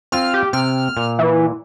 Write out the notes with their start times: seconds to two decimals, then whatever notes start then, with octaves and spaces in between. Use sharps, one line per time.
0.12 C4 F4 F5 F6
0.34 G4
0.53 C3 G5 F6
0.97 A#2
1.19 E3